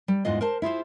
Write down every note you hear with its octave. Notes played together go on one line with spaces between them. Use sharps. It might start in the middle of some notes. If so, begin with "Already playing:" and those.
G3
E2 G#2 E3 F4 D#5
A#4 C5 A5
E4 F4 G#4 C5